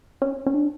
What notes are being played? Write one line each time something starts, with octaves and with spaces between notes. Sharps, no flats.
C#4
C#4
D4